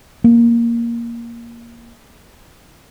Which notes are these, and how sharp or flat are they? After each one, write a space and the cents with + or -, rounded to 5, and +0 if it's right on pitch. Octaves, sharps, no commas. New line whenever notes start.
A#3 +5